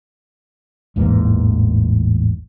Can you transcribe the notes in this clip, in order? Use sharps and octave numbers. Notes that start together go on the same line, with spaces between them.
A1 E2 G#2 A#3